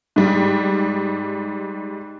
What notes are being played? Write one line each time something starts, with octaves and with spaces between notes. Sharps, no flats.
G#2 G3